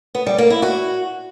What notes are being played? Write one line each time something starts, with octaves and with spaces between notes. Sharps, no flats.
B3
G3
A#3
E4
F#4